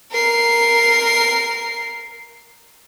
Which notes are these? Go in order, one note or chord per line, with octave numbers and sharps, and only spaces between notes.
A#4 C7